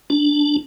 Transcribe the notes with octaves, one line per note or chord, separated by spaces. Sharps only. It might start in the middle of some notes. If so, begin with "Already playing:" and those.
D4